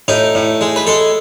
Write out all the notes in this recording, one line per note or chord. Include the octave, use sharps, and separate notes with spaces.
A2 D#4
A2
G#3
B4
G#3 A4